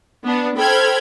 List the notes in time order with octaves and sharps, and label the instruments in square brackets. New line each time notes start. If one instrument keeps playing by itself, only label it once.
[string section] B3 D4
A4 C5 G5 B5 F6 G#6